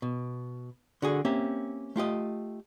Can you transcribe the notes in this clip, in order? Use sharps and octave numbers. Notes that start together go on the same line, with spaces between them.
B2
D3 F#4 G#4
A#3 C4 C#4 G4 E5
A3 F4 G4 D#5